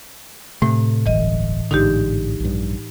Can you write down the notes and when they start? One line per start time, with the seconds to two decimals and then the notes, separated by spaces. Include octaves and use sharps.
0.62 A2 C3 A3
1.06 D1 G1 E3 D#5
1.71 A1 G#2 D3 D#4 G4
2.40 A#1 G2